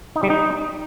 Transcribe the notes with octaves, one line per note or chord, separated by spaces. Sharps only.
D#4
G3
D#4